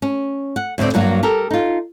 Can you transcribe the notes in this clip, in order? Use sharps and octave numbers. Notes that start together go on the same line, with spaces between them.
C#4
F#5
D2 A2 D#3 C4 D5
G2 F#3 A#3 F#4
G4 A4 A#4
D#4 F4